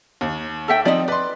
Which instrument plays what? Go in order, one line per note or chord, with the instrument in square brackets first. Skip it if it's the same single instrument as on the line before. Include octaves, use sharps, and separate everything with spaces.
[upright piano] D#2
[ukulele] A4 E5 G5
[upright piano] F3 C4 D#4 [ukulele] D5 D#5
[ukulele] B4 [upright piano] D5 C6